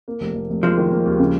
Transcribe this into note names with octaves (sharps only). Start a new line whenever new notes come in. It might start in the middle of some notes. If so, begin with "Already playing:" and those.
A#3
F1
F1
F1
F3 G#3 A#3
D#3
A#3
D#2
C#3